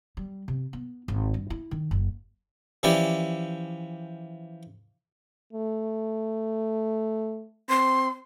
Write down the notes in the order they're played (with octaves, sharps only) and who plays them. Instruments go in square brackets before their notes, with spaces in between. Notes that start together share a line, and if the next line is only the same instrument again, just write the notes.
[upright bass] G3
C3
B3
G#1
G2
E4
D#3
F#1
[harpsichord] E3 F3 C#4 E4 G4 D5
[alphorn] A3
[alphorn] C4 [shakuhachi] C6